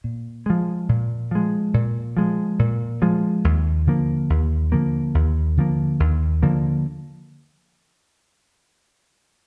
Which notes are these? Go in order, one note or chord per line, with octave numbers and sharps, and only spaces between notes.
A#2
F3 G#3
A#2
F3 G#3
A#2
F3 G#3
A#2
F3 G#3
D#2
D3 F3 A#3
D#2
D3 F3 A#3
D#2
D3 F3 A#3
D#2
D3 F3 A#3